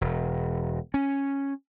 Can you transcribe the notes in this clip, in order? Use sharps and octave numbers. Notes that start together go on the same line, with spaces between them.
E1
C#4